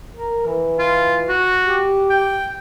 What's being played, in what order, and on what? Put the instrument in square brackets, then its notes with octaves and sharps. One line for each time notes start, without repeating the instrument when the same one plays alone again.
[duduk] A#4
E3
[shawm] F4
F#4
[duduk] G4
[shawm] G5